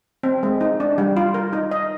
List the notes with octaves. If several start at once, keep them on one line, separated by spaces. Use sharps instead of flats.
C4
G#3
D#4
D4
G3
F4
A#4
D#4
D#5